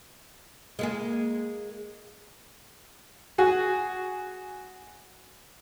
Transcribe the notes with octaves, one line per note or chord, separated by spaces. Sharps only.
G#3 A#3 G#4
F#4 G#4